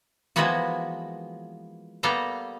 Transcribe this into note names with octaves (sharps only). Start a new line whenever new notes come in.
E3 F3 G#3 A#3 B3 F#4
G3 A#3 B3 A4 A#5